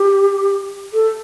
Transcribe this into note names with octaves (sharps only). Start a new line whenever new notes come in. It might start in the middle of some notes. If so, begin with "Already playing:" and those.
Already playing: G4
A4